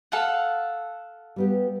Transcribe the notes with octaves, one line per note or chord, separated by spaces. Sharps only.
A4 F5 F#5
G3 B3 G4